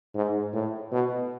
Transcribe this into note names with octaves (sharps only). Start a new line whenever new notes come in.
G#2
A2
B2